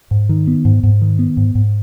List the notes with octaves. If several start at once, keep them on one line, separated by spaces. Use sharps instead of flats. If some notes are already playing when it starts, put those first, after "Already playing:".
G#2
D#3
B3
G#2
G#2
D#3
B3
G#2
G#2